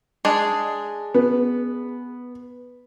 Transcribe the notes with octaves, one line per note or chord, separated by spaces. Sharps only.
G#3 D4 G#4
B3